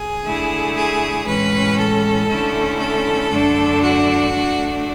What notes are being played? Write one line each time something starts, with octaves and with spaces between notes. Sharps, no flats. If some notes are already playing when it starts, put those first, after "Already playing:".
Already playing: G#4
D3 A3 E4
G#4
A2 E3 G#3 C#4 B4
A4
D3 A3 C#4 E4
A4
F#2 D3 A3 D4
F#4
D3 A3 D4